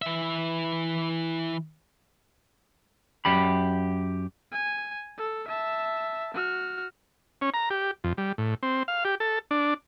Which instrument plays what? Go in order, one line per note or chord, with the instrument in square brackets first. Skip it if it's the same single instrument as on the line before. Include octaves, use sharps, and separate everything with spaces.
[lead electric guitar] E3 E5
[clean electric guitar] F#2 G4 B5
[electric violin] G#5
A4
E5 A5
F#4 F6
[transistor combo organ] C#4
A#5
G4
F2
G3
A2
C4
F5
G4
A4
D4